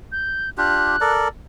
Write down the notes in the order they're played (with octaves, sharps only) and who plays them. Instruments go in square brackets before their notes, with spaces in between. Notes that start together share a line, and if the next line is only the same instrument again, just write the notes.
[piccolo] G6
[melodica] D4 F4 G4 [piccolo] F#6
[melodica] A4 A#4 D5